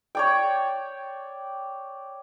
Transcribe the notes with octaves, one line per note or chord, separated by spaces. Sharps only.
C#5 D5 G5